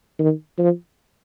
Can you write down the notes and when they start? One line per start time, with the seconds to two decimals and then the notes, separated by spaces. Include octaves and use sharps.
0.19 D#3
0.59 F3